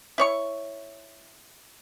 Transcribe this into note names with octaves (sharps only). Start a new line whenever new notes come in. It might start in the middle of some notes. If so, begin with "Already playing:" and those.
E4 C#5 C#6